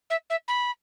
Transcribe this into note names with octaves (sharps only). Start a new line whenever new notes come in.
E5
E5
B5